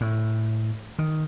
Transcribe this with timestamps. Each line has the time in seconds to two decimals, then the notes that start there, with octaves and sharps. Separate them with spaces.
0.01 A2
0.99 D#3